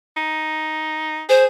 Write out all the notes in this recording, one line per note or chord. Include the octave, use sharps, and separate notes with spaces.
D#4
G#4 C5